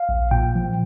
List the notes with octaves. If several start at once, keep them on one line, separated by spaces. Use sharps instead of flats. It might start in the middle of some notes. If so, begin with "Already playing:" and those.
Already playing: F5
A#1
A#2 G5
F3